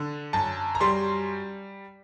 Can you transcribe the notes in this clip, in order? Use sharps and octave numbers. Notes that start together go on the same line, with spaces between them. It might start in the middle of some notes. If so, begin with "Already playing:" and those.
Already playing: D3 D4
F#2 A5
A#5
G3 C6